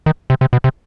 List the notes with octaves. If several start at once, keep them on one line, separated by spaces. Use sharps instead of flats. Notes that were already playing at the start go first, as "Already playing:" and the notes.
D#3
C3
C3
B2
C3